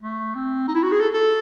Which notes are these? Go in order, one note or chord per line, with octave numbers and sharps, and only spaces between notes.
A3
C4
D#4
E4
F#4
G#4
A4
A4